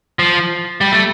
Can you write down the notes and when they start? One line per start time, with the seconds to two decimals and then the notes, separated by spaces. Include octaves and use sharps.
0.19 F3
0.81 G3
0.92 A3